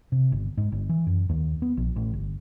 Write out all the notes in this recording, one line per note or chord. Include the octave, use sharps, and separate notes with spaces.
C3
G1
G#2
G1
E3
F#2
D#2
B3
A#1
A1
G1